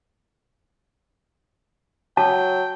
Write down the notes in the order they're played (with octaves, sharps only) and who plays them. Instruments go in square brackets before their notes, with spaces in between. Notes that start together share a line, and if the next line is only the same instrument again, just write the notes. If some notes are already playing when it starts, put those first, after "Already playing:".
[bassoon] F#3 [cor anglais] G5 [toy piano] A5